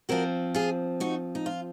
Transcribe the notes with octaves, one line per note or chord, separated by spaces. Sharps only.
F3 C4 F#4 A#4
F4 G#4
D#4 F#4
D#4
F4